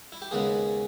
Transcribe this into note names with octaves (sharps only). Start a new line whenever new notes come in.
E4
G4
D#2 C#3 G#3 B3 G#4